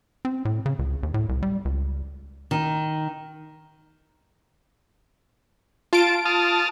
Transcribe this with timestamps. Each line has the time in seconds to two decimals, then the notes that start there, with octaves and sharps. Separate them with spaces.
0.25 C4
0.45 A2
0.66 C#3
0.79 C#2
1.03 D#2
1.14 A2
1.29 C2
1.43 G3
1.65 C#2
2.51 D#3
5.93 F4 A5 D7
6.25 A5 D#6 F6